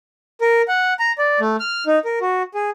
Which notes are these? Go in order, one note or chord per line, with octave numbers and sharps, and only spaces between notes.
A#4
F#5
A#5
D5
A3
F6
D#4
A#4
F#4
G#4